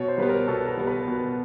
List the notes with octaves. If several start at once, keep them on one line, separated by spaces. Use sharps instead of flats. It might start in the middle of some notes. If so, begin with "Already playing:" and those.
Already playing: B2 C#5
C5
G3 B3 B4
A#4
B2 A4
A#4
G3 B3
B4
B2